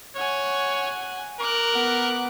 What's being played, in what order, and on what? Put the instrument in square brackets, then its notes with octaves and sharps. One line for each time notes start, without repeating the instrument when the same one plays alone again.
[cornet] C#5 [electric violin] F#5 G#5
[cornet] A#4 [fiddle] D6 F#6
[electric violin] B3 F#5